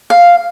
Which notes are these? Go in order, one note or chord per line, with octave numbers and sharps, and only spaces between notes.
F5